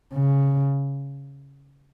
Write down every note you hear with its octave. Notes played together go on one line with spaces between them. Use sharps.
C#3